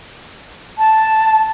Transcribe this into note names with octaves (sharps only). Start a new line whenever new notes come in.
A5